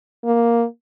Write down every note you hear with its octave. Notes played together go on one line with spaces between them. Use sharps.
A#3